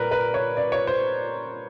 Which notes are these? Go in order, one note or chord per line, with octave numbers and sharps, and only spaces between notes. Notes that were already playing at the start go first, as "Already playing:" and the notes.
Already playing: A#2 G3 A#4 B4
B4
C#5
D5
C#5
C5